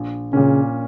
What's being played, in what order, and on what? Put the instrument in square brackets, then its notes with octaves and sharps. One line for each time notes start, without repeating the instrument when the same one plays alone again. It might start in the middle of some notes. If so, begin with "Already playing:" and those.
Already playing: [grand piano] A#1
[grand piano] A#2 A#3 C#4 [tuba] C#3